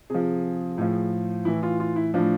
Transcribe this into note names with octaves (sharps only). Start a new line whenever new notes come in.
C3 F3 G#4
A2 F3
A2 E3 E4
F4
F4
E4
A2 F3 D4